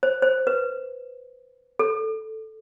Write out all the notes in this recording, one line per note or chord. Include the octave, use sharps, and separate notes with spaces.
C5
C5
B4
A4